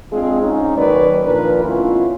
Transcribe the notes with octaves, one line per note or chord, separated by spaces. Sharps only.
G#3 C4 D4 F4 G#4
G#2 C#4 D#4
D#3 F#3 A#3 B4 C#5 D5
A#2 D#3 F3 D4 A#4 B4
B2 A3 C#4 E4 F4